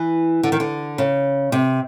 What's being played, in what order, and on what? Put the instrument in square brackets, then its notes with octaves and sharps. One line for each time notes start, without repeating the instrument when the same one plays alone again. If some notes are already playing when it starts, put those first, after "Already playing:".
Already playing: [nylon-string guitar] E3
D3
D#3
D3
C#3
C3